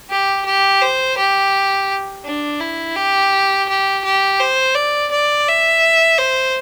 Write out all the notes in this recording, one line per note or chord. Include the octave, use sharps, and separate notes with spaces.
G4
G4
C5
G4
D4
E4
G4
G4
G4
C5
D5
D5
E5
C5